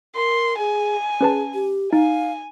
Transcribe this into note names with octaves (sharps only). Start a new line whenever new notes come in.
A#4 C6
G#4 G#5
C#4 G#4 B4 A5
G4
D#4 F5 G#5